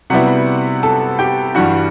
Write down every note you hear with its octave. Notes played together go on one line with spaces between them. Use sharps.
C3 G3 B3 E4 F#4 F#5
A4 A5
G4 G5
G2 E3 G3 D4 F#4 F#5